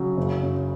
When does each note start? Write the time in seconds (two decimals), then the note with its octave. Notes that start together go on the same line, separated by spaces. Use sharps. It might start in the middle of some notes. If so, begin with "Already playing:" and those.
Already playing: C#3 F#3
0.17 F#1
0.43 F#2